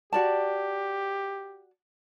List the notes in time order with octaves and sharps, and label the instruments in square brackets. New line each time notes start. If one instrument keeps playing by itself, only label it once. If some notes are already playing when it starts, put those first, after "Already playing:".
[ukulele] F#4 D5 A5 [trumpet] G4